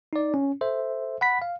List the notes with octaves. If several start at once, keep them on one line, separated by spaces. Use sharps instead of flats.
D#4 D5
C#4
A4 C5 E5
F#5 B5 B6
F5